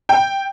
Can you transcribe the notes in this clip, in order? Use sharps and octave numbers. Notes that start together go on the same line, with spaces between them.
G5